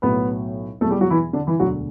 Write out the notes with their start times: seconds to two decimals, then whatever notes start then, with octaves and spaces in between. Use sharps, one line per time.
0.02 B1 A2 F#3 B3 B4
0.81 E2 B2 F#3 A3 A4
0.91 G3 G4
1.01 F#3 F#4
1.10 E3 E4
1.33 D3 D4
1.47 E3 E4
1.60 E1 D2 D3 F#3 F#4